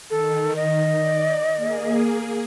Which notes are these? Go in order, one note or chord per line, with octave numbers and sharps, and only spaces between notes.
D#3 A4
D#5
D5
A#3 G#4